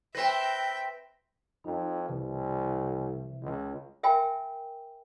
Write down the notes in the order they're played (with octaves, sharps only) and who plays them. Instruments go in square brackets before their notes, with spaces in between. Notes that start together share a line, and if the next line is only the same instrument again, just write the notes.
[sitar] C4 B4 [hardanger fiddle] E5 G5 [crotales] A#6 B6
[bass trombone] F2 [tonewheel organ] D#4
[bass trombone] C2 [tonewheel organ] C3 E3
[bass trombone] C#2
[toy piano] A#4 E5 G5 G#5 B5